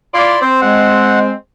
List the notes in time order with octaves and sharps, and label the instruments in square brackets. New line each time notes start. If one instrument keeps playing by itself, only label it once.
[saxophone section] E4 F4 D5 [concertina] C6
[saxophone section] C4 [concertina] C5
[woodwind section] G#3 [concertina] F#5